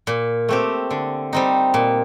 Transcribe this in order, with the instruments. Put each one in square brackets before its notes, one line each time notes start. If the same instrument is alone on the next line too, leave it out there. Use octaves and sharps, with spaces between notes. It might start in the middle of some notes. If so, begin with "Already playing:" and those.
[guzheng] A#2
A3 C4 G4
D3
G3 C4 D#4
A#2